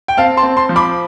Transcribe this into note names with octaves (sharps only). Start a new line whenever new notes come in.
G5
C4 F5 A5
A5 C6
C4
A5 C6
F3
B5 D6